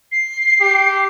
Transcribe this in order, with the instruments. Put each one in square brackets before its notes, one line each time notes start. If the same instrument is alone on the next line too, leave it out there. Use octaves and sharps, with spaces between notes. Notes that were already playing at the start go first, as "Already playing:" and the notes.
[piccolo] C7
[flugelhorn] G4